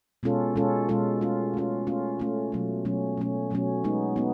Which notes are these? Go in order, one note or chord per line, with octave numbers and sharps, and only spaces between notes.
B2 G#3 C#4 F4 A4
B2 G#3 C#4 F4 A4
B2 G#3 C#4 F4 A4
A3 C#4 F4
A3 C#4 F4
A3 C#4 F4
A3 C#4 F4
B2 F#3 A3 C#4
B2 F#3 A3 C#4
B2 F#3 A3 C#4
B2 F#3 A3 C#4
G#3 B3 D#4
B3 D#4